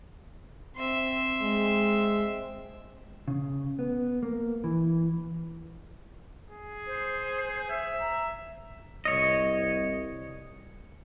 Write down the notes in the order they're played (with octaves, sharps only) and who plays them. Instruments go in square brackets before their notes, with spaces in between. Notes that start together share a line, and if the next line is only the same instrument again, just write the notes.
[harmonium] C4 [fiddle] E5 C6
[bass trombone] G#3
[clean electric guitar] C#3
B3
A#3
E3
[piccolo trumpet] G#4
[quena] C5
[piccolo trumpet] E5
[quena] A#5
[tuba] C2 [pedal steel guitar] C#5 D#5